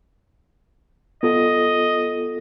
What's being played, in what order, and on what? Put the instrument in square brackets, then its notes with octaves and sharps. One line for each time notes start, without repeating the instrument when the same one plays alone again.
[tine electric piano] B3 F4 A4 [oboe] D#5